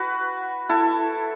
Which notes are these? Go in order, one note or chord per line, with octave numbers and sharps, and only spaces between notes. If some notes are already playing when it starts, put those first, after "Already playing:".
Already playing: F#4 B4
E4 A4